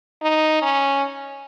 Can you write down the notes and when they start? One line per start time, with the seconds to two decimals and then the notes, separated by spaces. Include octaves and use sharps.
0.23 D#4
0.62 C#4